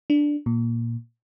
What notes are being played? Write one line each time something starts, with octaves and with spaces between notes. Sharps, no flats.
D4
A#2